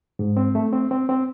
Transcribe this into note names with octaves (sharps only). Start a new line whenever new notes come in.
G#2
C4
A3
C4
C4
C4